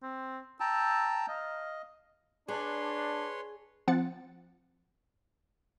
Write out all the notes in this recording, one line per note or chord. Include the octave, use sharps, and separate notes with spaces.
C4
G5 A5 A#5 E6
D#5 F5
D4 G#4 B4 C#5 C6
F3 C4 F#5 A6 C#7